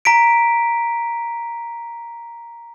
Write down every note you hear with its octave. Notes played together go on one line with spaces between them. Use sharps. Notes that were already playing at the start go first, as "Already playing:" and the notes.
A#5 B6 D7